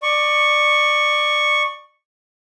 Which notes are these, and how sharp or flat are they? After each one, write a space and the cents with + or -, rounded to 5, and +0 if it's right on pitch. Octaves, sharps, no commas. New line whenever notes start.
D5 +20 C#6 +0